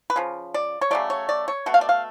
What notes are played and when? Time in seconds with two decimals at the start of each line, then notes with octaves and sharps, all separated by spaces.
0.10 B4
0.16 C#3 F3
0.54 D5
0.81 C#5
0.91 C#3 F#3 A3 D5
1.10 C#5
1.29 D5
1.48 C#5
1.66 B2 A3 F#5
1.74 F5
1.81 D5
1.89 F5